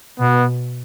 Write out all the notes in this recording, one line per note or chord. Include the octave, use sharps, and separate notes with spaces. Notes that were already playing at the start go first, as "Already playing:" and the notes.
B2 B3